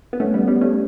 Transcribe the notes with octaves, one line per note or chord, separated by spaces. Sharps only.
B3
A3 C#4
G3 B3
G3 B3
A3 C#4